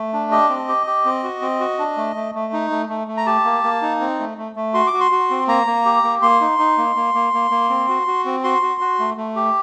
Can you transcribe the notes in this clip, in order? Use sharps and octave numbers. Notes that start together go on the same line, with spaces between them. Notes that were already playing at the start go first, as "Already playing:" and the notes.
Already playing: A3
D4
G4 D#5
C4
G4
G4
C4
F#4
C4
F#4
D4
A3
A3
A3
D#4
A3
A3
A3
A#5
G4 A5
A#3
A#3
D#4
C4
A3
A3
A3
F#4 C6
D6
F#4
C6
F#4
C4
A#3 A#5
A#3
G4
A#3
A#3 C6
D#4
D#4
A#3
A#3
A#3
A#3
A#3
C4
F#4
F#4
C4
F#4 C6
F#4
F#4
A3
A3
G4